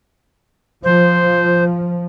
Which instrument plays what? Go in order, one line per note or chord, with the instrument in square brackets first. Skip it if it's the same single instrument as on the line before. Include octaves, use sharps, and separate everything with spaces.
[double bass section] F3 [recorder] C5